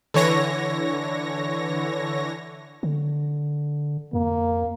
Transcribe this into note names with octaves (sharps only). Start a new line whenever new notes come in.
D3 E3 C#5 A#6
D3
F2 A#3